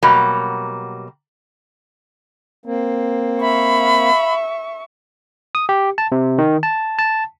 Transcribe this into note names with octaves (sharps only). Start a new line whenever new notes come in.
B2 F#3 G3 A#3
A#3 C4
E5 F5 B5 C#6
D#6
G4
A5
C3
D#3
A5
A5